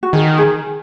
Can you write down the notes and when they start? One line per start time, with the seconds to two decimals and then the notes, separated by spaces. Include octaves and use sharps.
0.03 F#4
0.13 D#3 G#4
0.38 G#4